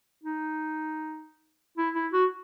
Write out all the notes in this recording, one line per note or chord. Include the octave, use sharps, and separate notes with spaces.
D#4
E4
E4
F#4